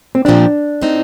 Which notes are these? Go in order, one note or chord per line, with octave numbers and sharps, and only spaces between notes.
C4
A#2 F3 C4 D4 G4
A2 A3 C4 D#4